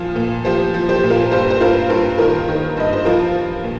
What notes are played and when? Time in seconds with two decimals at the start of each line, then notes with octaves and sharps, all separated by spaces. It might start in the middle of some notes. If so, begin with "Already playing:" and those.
Already playing: A#2 F3 F5
0.16 A#2
0.45 F3 G4 C5
0.74 F3
0.89 G4 C5
1.04 A#2
1.10 F4 A#4
1.31 G2 G4 C5
1.50 C5
1.61 G2 F4 A#4
1.89 G2 F4 A#4
2.18 D#3 F4 A#4
2.48 D#3
2.77 G2 D#5
2.93 C5
3.05 F3 F4 A#4
3.34 F3
3.64 A#2